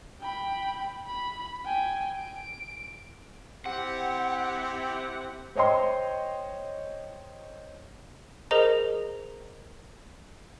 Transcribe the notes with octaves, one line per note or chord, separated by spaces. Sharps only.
G5 B5
B5
G5 G#5
D7
C4 E4 G4 F#5
C5 C#5 D#5 G5 C6
G#4 A#4 C5 D#5 A#5